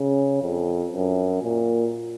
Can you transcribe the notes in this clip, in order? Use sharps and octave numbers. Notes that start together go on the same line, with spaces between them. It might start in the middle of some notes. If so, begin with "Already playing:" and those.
Already playing: C#3
F2
F#2
A#2